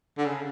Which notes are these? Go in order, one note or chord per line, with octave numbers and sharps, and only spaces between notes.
D3
C#3